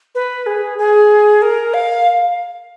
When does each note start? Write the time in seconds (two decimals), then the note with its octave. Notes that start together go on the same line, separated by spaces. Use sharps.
0.15 B4
0.46 G#4
0.78 G#4
1.42 A#4
1.74 F5